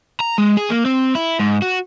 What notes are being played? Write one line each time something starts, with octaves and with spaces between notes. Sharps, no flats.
A#5
G#3
G#4
A#3
C4
E4
G#2
F#4